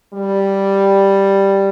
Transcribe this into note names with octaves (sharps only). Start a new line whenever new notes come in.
G3